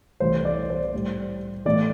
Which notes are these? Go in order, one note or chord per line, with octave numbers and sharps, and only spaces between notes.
C2 C3 E3 A3 C5
D5
C5
A2 G3
A2 E3 A3 D5